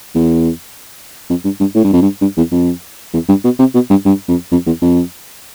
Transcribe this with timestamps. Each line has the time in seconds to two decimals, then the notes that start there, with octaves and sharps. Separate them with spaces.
0.15 E2
1.29 F2
1.44 G2
1.60 G2
1.75 A2
1.84 G2
1.93 F2
2.02 G2
2.21 G2
2.37 E2
2.52 F2
3.13 E2
3.29 G2
3.44 B2
3.59 C3
3.74 B2
3.90 G2
4.05 G2
4.28 F2
4.51 F2
4.66 E2
4.81 F2